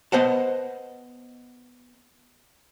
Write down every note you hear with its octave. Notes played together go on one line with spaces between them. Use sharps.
B3 C5 D#5 F#5 A5